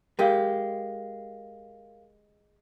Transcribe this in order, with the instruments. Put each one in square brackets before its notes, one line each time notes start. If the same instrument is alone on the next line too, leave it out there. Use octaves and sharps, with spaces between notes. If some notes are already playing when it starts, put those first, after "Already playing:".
[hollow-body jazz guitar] G#3 G4 [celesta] A#4 F5